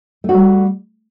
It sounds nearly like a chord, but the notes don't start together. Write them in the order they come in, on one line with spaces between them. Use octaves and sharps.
A3 F#4 G3